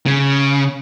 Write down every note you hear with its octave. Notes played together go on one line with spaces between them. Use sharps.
C#3